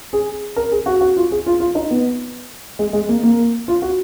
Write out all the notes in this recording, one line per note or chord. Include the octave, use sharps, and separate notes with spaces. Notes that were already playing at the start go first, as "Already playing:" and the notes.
G#4
A#4
G#4
F#4
F#4
F4
G#4
F4
F4
D#4
B3
G#3
G#3
A#3
A#3
F4
F#4